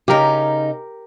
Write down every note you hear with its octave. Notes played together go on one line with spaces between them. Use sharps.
C#3 D#4 G4 A#4